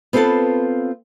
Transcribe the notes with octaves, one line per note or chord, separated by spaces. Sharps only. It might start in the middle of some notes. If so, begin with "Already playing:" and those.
B3 C4 F4 A4 B4 A5